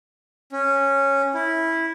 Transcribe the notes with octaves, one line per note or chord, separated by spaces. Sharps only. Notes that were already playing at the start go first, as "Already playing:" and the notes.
C#4
E4